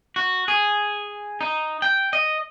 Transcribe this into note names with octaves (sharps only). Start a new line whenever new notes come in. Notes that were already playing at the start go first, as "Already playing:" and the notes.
F#4
G#4
D#4
G5
D#5